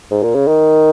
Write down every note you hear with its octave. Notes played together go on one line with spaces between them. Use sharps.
G#2
A#2
C#3
D#3